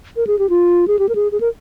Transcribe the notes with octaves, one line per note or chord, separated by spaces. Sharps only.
A#4
G#4
G4
F4
G#4
G4
A#4
G#4
G#4
A#4